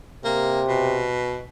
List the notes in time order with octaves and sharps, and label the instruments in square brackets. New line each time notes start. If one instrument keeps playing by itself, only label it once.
[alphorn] C3 [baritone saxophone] A#3
[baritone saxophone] B2